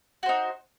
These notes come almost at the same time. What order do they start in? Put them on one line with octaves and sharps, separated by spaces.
F#4 C5 D#4